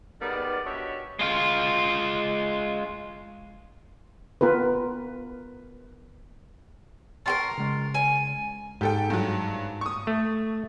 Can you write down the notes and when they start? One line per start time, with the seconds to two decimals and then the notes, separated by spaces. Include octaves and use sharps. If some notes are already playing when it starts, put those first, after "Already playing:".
0.21 D#3 G3 G#3 B3 D5
0.65 D4 F#4 G4 C#5 D#5 E5
1.19 G#3 F4
4.41 B3 F4 A#4 B4
7.26 F4 G4 A#4 A5 C6 C#6
7.58 C#3 G#3
7.94 G#5
8.81 G#2 G4 A4 G5
9.10 G2 F#3
9.81 C#6 D#6
10.07 A3